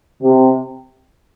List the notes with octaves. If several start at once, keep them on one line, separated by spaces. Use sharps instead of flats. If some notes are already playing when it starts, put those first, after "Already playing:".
C3